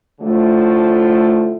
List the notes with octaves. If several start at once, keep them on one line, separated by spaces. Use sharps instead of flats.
A2 D3 F3 A3